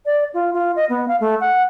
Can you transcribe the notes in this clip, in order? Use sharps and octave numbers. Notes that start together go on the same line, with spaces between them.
D5
F4
F4
D#5
B3
F5
A3
F#5